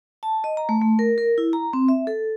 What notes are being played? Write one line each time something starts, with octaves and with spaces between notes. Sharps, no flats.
A5
D#5
A#5
A3
A3
A#4
A#4
E4
A#5
C4
E5
A4